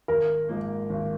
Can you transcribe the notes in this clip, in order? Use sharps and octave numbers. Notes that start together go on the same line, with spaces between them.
G#1 A#4
G#2 F3 A#3
G#1